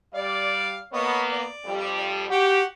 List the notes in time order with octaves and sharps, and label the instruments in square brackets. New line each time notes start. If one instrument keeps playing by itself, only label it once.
[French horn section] G3 D5 [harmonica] F5
[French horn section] A#3 B3 [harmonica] C#5 D#5
[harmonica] D5
[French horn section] F2 G3
[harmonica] F#4 F#5 [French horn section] G4